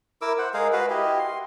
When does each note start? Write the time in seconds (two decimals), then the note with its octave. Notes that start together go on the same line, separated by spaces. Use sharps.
0.22 E4 A#4 D6 E6
0.38 C5 F#5
0.54 G#3 G#4 A#4 F5
0.73 F#4 B4 F5
0.90 E4 G4 D#5
1.19 C6